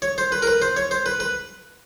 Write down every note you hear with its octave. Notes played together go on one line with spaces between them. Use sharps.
C#5
C5
B4
A#4
B4
C5
C#5
C5
B4
B4